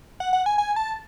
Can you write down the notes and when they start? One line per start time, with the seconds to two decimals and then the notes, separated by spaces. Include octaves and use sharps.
0.20 F#5
0.33 F#5
0.46 G#5
0.58 G#5
0.76 A5